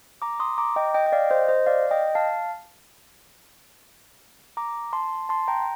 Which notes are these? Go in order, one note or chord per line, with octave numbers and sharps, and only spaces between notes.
A#5 D6
C6 D#6
A#5 D6
D#5 G5
D#5 G5
G5
D5 F5
C5 D#5
C5 D#5
D5 F5
D#5 G5
F5 A5
A#5 D6
A5 C6
A5 C6
G5 A#5